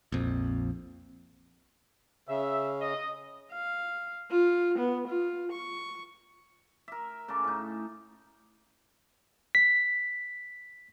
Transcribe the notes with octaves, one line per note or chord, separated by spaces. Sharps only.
A#1 F2
C#3 E5
D#5
F5
F4
B3
F4
C#6
A#4 E5
C#3 C#4 A4 D6
A2 D#4
B6